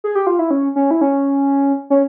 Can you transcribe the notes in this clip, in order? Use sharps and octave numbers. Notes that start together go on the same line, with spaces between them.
G#4
G4
F4
E4
C#4
C#4
E4
C#4
C#4